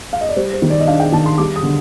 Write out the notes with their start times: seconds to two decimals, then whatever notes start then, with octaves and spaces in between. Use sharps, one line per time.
0.13 F5
0.21 D#5
0.29 D5
0.36 G3 C5
0.53 C5
0.62 D#3
0.70 D5
0.80 D#5
0.87 D4 F5
1.00 G5
1.12 D#3 A5
1.26 C6
1.38 G3 D6
1.56 D#6
1.63 D3